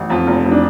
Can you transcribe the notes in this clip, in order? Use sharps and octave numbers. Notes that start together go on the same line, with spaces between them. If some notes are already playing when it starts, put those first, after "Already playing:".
Already playing: A1
F2 F4
F1
F1
D4